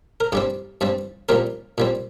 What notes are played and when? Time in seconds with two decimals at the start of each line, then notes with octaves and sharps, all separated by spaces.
0.20 A#4
0.32 G2 G3 C4 G4
0.81 G2 G3 C4
1.29 A#2 G3 C4 A#4
1.78 A#2 G3 C4